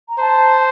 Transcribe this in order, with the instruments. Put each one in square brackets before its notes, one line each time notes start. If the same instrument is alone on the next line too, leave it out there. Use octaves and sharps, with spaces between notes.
[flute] A#5
[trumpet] C5 [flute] A5